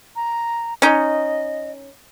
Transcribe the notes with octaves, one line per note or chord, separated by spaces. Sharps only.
A#5
C#4 D#4 D#5